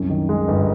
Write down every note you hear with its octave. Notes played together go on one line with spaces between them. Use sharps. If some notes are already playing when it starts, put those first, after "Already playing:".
Already playing: C2 F#2
D#3
G#3
G1